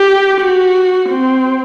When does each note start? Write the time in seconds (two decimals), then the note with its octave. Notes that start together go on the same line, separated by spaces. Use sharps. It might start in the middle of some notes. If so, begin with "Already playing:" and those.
Already playing: G4
0.41 F#4
1.10 C4